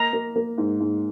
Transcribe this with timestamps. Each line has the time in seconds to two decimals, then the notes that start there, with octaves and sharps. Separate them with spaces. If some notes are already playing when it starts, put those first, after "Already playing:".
Already playing: A#3 A#5
0.13 A#3
0.36 A#3
0.58 G#2
0.80 G#2